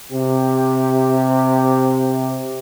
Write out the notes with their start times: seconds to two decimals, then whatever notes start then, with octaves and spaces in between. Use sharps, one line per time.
0.11 C3 G4